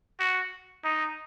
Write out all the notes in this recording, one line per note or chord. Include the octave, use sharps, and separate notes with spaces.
F#4
D#4